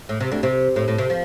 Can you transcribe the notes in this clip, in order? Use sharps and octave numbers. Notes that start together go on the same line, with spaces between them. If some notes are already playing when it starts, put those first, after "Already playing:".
A2
C3
D2 D3
C3
A2
A2
C3
F3